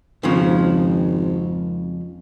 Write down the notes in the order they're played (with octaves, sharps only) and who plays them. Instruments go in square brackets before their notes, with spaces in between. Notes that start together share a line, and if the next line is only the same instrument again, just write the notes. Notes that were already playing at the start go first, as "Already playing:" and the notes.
[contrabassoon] G#1 [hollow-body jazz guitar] F2 C#3 F3